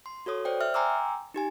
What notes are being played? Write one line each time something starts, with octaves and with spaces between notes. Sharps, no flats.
C6
F#4 A4 C#5 D#6
C5 D5 G5
E5 F6
G5 G#5 A#5 C6 D6 E6
D#4 G4 G#5